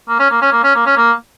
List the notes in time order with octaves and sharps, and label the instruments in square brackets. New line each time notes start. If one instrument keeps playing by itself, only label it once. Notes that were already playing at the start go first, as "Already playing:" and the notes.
[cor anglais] A#3
C#4
A#3
C#4
A#3
C#4
A#3
C#4
A#3